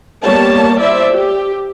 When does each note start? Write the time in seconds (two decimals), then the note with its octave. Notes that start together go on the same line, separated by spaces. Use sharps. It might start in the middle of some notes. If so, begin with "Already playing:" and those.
0.23 G3 A#3 B3 C#5 A5
0.79 E4 C5 D5 E5
1.10 G4